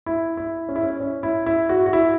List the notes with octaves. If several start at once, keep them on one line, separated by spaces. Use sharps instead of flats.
E4
E4
C#4
E4
C#4
C#4
E4
E4
F#4
F#4
E4